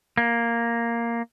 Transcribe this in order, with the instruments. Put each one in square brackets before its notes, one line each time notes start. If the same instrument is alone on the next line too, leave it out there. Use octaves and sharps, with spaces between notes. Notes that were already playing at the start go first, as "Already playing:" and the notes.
[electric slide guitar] A#3